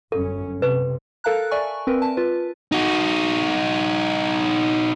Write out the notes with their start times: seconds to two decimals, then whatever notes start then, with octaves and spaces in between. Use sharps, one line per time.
0.12 G1 F#2 C#4 A4
0.62 C3 B4
1.24 A4 A#4 F5 A5 A#5 F#6
1.51 D5 E5 G#5 C#6
1.87 C4 A#4 B4
2.02 A5
2.17 F4 B4
2.72 D#4 F#4